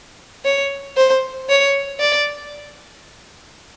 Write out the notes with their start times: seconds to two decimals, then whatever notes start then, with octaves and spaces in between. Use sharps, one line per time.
0.45 C#5
0.97 C5
1.49 C#5
2.00 D5